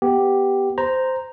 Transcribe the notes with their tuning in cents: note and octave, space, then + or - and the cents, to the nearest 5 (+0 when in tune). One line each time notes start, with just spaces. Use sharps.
B3 +0 G4 +0
C5 -10 A#5 +0